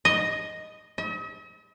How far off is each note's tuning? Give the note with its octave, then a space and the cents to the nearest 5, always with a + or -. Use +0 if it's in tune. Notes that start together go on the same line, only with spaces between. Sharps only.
D#5 +0
D#5 +45